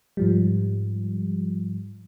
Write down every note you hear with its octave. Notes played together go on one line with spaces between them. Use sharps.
G#2 F3 G3